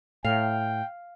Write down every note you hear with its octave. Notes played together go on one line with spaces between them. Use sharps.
A2 F5 G5